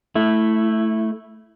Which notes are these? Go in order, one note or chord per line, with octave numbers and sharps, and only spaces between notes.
A3 E4